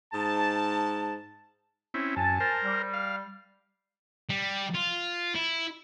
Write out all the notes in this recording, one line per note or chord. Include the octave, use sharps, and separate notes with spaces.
G#2 A5
C4 C#4 E4
F#2 G#5 A5
A#4 C5
G3
F5
G3
F4
E4